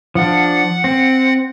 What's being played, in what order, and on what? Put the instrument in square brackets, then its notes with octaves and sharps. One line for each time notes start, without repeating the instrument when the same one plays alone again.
[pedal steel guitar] F3 D4 [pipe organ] F#5
[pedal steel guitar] C4